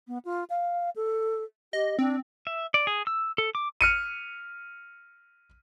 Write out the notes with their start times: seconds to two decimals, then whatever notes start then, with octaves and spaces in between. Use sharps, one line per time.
0.08 B3
0.25 F4
0.50 F5
0.96 A4
1.73 G4 D#5
1.99 C4 D4
2.47 E5
2.74 D5
2.87 G#4
3.07 E6
3.38 A4
3.55 D6
3.81 F6 C#7 D#7